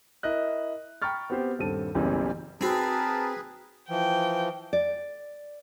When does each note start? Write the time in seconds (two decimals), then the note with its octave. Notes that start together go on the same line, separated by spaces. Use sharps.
0.23 E4 A#4 D#5 F#6
1.02 G5 A#5 B5 C#6 F6 A6
1.30 B3 C4 G4 C5
1.59 D#1 G2 G3 C4 A4 D#7
1.95 F#1 B1 F#2 C#3 E3 G3
2.61 C4 D#4 F#4 G#4 A#4 B4 A5
3.89 E3 F3 G5
4.73 D5